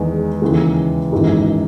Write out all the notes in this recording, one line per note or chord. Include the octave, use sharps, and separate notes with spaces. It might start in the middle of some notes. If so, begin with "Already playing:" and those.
Already playing: E2 D#3 G#3 D#4
D#2 C#3 E3 G#3
G#1 F#2 E3 G#3 D#4